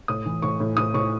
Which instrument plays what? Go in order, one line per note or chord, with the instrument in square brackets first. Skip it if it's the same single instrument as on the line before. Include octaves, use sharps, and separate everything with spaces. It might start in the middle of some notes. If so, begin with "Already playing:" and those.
[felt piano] A2 D#6
E3
A2 C#6
A2
A2 D#6
A2 C#6